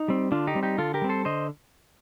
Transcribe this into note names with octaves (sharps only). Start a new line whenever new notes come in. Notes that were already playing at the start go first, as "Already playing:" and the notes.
Already playing: D#4
G3 C4
D3 D4 F4
D#4 G4
G3 C4
D#4 G4
D3 F4 A4
G4 A#4
G3 C4
A4 C5
D3 C5 D#5